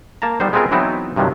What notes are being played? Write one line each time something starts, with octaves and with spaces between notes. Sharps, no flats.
A#3 A5 A#5
G3 B3 D#4 C5
G#3 B3 C4 F4 G#4 A#4
E3 F#3 B3 C4 D#4 E4
G2 C3 D#3 F3 F#3